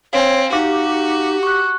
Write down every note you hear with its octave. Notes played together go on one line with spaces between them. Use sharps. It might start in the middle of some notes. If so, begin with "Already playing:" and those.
C4 C#5 F5 G#5
D#4 F#4 G4 F5
C#6 F#6